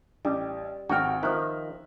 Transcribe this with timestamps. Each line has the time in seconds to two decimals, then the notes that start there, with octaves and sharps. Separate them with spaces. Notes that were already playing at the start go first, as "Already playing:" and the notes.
0.25 A1 G3
0.89 G#1 F#4 G5 F6
1.23 D#3 F3 E5 A#5 F#6